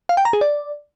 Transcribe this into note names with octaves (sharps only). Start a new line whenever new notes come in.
F5
G5
A#5
G#4
D5